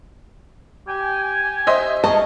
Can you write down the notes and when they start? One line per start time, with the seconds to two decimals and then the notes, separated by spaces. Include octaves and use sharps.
0.88 G4 G#5
1.67 C5 D#5 E5
2.04 G#4 A#4 C#5 D#5 A5